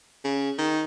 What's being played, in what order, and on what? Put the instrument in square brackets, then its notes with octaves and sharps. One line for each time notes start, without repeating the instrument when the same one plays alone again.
[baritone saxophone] C#3
D#3